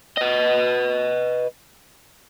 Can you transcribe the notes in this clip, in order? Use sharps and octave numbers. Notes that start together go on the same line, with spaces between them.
B4 D#5